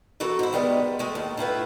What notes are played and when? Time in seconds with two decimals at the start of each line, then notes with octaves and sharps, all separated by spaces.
0.20 E3 F#4 A4 A#4
0.39 G#2 E4
0.53 D#3 G3 G#3 B3
0.99 G#3 A3
1.15 D#2 A2
1.37 A2 E4 F4 B4